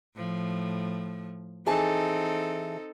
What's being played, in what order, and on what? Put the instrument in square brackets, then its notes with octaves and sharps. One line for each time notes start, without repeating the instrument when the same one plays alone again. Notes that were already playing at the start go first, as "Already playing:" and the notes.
[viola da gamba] A2 F3
[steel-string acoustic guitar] E3 G#4 A5 [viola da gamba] C4 D#4 A4